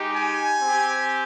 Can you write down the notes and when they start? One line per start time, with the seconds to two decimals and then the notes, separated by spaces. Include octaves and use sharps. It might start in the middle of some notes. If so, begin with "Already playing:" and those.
Already playing: G#3 D#4 G4
0.14 G#5
0.62 C4 G4